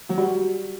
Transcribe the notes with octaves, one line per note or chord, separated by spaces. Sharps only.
F#3
G3 F#4